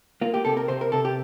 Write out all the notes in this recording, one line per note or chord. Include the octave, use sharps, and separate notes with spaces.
A#3 F4
G4
C3 A4
A#4
C3 C5
A#4
C3 A4
G4